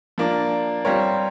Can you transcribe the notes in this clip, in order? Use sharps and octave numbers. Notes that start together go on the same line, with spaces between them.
F3 A#3 D4
G3 C4 F4 A#4 C#5